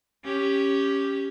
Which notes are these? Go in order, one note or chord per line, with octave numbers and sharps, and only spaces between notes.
C#4 G4